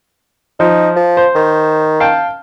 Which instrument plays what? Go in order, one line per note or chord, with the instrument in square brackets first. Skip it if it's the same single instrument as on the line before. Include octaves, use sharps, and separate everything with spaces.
[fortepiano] F3 [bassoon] D#4
[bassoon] F3
[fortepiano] C5
[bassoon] D#3
[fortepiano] F5 G5 A5